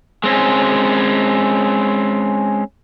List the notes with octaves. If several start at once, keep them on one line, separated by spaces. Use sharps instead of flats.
G#3 C4 C#4